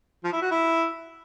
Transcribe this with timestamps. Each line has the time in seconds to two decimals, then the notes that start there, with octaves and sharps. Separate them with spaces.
0.24 F3
0.33 E4
0.42 F#4
0.51 E4